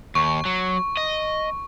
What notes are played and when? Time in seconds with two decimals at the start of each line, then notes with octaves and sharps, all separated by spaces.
0.15 D#2 C#6
0.45 F#3
0.97 D#5